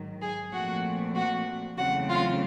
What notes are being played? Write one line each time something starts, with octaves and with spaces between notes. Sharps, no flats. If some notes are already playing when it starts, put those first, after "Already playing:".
Already playing: G#2 D#3 F#3
G#4 G#5
A#2 F3 A3 C4 F#4 F#5
F#4 F#5
E2 C#3 F#3 A3 C4 F#4 F#5
F4 F5